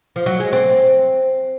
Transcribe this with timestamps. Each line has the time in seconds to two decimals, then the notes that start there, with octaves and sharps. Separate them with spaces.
0.16 F3
0.26 F#3
0.40 G#3
0.53 C4